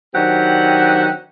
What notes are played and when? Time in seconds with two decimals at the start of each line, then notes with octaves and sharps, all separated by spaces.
0.14 D#3 F#3 C4 D4 G4 F#5